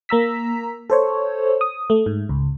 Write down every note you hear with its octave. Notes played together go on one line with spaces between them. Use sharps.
A#3 A#5 E6 B6
A4 C5 C#5
D#6
A3
G#2
C#2